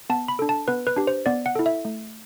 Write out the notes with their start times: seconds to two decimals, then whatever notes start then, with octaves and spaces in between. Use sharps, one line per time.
0.10 B3 A5
0.28 B5
0.39 D4 A4
0.49 A5
0.68 B3 B4
0.87 B4
0.96 D4 G4
1.07 C5
1.26 B3 D5
1.46 F#5
1.55 E4 A4
1.66 E5
1.85 A3